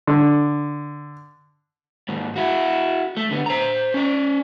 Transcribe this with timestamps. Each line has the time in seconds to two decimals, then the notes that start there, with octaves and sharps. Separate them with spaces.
0.07 D3
2.08 D#2 G#2
2.36 E4 F#4
3.17 A3
3.31 D3 B3
3.46 C5 A#5
3.94 C#4 D5